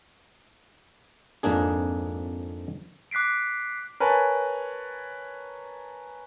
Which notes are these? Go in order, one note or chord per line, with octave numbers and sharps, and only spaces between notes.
F2 G#2 A#3 D4 G#4
D6 F#6 B6 C7 D7
A#4 B4 C#5 G#5 A5